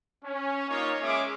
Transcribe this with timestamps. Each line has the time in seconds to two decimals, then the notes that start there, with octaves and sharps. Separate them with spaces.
0.24 C#4
0.68 A#3 D#4 F4 C#5
1.00 G#3 C#4 G#4 E5 D6